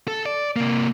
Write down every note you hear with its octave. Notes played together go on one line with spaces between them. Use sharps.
A4
D5
C3 A#3